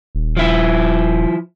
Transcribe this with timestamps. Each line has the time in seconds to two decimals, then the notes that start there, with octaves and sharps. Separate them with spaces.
0.15 D#1
0.37 F3 E4